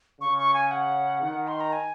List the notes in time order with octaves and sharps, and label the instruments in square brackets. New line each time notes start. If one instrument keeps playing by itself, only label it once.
[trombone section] C#3 [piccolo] C#6
[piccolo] C#6
G#5
F#5
[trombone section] D#3
[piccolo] C6
A#5
G#5